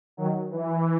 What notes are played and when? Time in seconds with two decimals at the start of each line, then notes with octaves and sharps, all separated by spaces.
0.17 D#3 F#3
0.51 E3